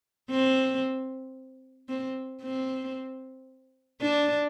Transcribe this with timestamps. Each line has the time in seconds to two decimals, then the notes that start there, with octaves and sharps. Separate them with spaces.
0.31 C4
1.89 C4
2.43 C4
4.02 D4